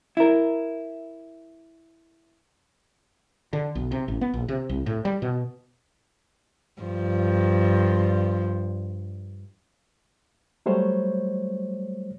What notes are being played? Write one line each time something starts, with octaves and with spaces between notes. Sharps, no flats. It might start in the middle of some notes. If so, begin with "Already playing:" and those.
E4 A#4
D3
B1
C3
A1
B3
A#1
C3
C2
A2
G3
B2
G2 F3
F#3 G3 A3 C5 C#5